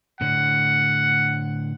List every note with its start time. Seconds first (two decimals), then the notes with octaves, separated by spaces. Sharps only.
0.21 A2 D3 F#5